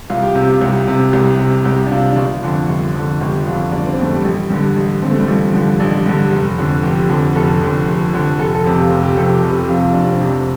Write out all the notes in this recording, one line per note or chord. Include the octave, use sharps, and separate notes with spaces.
C2 F4
G4
C3 G4
F4
C2 G4
C3
C2
C3
C2 G4
D4
C3 F4
D4
G1 F4
F2 D3
G1
F2 D3
G1 G4
F2 D3 F4
G1 D4
C4
F2 D3 A3
G3
A1
G2 D3
A1
G2 D3 C4
A3
G3
A1 F3
G2 D3 F3
A1 D4
G2 D3
F1
F2 D3
F1 G4
F2 D3
F1 A4
F2 D3
F1
F2 D3
F1 A4
A4
F2 C3
F4
F1 G4
G4
F2 C3 A4
G4
F1 G4
G4
F2 C3 F4
F4
F1 D4
C4
F2 C3 D4